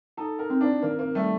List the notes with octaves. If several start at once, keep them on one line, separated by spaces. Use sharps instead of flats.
D#4 A4
A#4
C4
D4
D#3 A#3
A#3
G3 A3